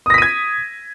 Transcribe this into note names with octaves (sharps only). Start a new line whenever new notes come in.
D#6 G#6 A#6 B6 D#7